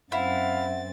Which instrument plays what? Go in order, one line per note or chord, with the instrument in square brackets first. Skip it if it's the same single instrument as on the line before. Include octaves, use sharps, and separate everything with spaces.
[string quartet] F#2 C4 A6 [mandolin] E4 [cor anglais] F5 [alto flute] F#5